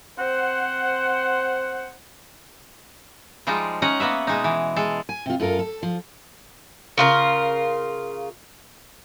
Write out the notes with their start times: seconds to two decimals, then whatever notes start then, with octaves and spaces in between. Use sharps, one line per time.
0.18 C4 C5 F#5
3.47 F3 G3 G#3 D#4 F4
3.82 C#4 D#4 D#5 F#5 A#5
4.00 A#3 B3 B4 E5
4.27 B2 G#3 D#4
4.44 E3
4.76 G#3 A4
5.09 G#5
5.26 C3 F4
5.40 F#2 F4 A4 A#4
5.59 A4
5.83 F3
6.98 C#3 F4 A#4